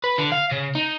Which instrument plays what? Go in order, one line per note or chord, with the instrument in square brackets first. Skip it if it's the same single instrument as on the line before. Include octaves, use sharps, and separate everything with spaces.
[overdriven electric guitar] B4
D3
F5
C#3
D#4